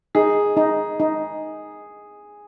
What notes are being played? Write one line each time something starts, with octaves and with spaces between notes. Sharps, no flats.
D#4 G#4
D#4
D#4